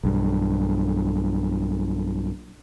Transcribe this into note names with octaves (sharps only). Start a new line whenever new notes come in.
B1 G2